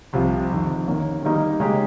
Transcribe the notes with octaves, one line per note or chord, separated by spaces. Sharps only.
C2 C3 F3
F2 C3 D#3
D#3 A#3 C#4
D#3 G3 A#3 D#4 A#4
C#3 G#3 D#4 G4